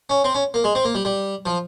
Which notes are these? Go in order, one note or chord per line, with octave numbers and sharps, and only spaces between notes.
C#4
C4
C#4
A#3
G#3
C4
A#3
G3
G3
F3